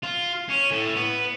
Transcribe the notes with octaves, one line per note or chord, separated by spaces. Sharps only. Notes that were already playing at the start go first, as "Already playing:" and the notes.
F4
C#4
A2
B3